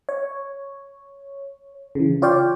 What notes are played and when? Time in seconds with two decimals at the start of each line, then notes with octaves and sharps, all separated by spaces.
0.09 C#5
1.95 C#3 E3
2.22 F4 C#5 D5 F5 G5